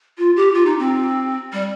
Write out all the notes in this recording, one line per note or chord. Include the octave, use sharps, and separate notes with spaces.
F4
G4
F4
D#4
C4
G3